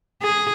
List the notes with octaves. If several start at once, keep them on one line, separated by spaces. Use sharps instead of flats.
G#4